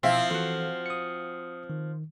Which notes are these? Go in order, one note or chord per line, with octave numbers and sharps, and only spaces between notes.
B2 F3 C4 E4 E5 F5
E3 F4 F#4 A4 F6
D#6 C#7
D#3